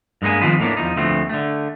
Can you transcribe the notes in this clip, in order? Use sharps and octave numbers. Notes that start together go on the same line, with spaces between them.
G2 G#3 A#3 B3 G#5
D#3 F3 B3 C4 F4 B4
A2 A#3 B3 D4
E2 F3 D#4
D2 F3 A3 B3 C4
D3 A3